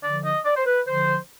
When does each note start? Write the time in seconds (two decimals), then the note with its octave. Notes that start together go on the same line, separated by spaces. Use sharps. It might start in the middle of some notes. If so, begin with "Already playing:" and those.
0.02 D3 F3 D5
0.24 D#5
0.45 D5
0.56 C5
0.66 B4
0.87 D3 F3 C5